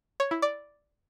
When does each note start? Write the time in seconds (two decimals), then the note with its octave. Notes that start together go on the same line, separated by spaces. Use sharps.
0.20 C#5
0.31 E4
0.42 D5